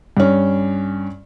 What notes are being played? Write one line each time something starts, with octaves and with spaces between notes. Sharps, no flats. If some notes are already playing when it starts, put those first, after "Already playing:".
G2 C#4